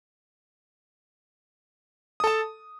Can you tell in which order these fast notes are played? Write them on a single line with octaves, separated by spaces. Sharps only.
D#6 A4 A5